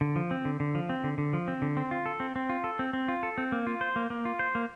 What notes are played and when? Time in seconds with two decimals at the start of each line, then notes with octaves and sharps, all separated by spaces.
0.01 D3
0.16 F3
0.31 C4
0.45 D3
0.60 D3
0.75 F3
0.89 C4
1.04 D3
1.18 D3
1.33 F3
1.48 C4
1.62 D3
1.77 C4
1.91 F4
2.06 A4
2.20 C4
2.36 C4
2.49 F4
2.64 A4
2.79 C4
2.93 C4
3.08 F4
3.23 A4
3.38 C4
3.52 A#3
3.67 F4
3.81 C5
3.96 A#3
4.10 A#3
4.25 F4
4.39 C5
4.55 A#3